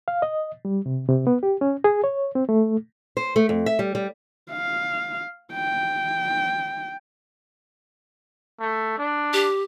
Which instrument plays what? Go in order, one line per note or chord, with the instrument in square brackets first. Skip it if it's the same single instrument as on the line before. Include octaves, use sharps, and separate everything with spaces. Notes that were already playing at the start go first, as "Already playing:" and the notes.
[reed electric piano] F5
D#5
G3
C3
C3
B3
G4
C#4
G#4
C#5
C4
A3
[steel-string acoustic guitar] C5
A3
F2
E5
G3
G3
[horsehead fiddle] F5
G5
[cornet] A3
D4
[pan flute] G4